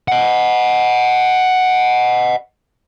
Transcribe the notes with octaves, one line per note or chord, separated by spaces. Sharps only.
D#5 F#5